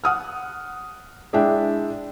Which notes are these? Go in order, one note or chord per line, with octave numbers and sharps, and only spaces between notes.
F#5 D#6 F6
G#3 D4 E4 E5 G5